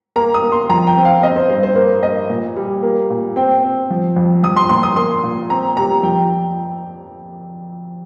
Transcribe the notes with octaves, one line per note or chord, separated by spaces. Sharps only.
A#3 A#5
D#6
A#3
C6
F2 A#5
G5
C4
F5
C4 D#5
C5
G2 C5
C5
A#3 C5
A#3 D#5
A#2
G3
A#3
A#2
C4 G5
C4
F3
F2
F3 D#6
C6
A#2 C6
D#6
A#3 C6
A#2
C4 A#5
C3 A#5
F2 G5